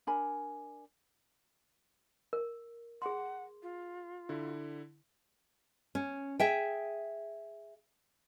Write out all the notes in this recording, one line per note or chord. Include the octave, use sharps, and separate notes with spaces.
D4 A#4 G#5 B5
A#4
G#4 F#5 C6
F4
D3 E4
C#4
G#4 E5 G5